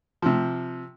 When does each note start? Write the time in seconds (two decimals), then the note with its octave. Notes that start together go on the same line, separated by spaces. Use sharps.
0.22 C3 F3